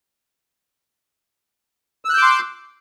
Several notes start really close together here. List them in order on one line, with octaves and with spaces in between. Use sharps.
E6 F#6 G6 D6 C6